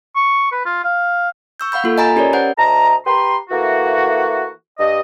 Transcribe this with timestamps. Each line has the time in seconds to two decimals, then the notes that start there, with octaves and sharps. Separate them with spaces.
0.16 C#6
0.52 B4
0.65 F4
0.84 F5
1.60 C#6 E6 G6
1.72 F5 F#5 B5 G6
1.84 A#3 F4 A4
1.98 D#5 G#5 A#5 B5 A6
2.16 C#4 G4 A#4 C#5 D5
2.33 C5 F#5 G6
2.57 D2 D#5 A5 A#5
3.06 G4 B4 A#5 C6
3.49 E3 A3 A#3 F#4
4.78 G2 D#5